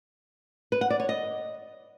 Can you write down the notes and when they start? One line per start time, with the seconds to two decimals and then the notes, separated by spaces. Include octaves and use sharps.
0.72 B4
0.81 F#5
0.90 D5
1.00 C#5
1.09 D#5